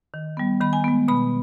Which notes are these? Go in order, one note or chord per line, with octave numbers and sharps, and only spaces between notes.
D#3
G3 B3
D#3 B5
G#5
G#3 B3
B2 B5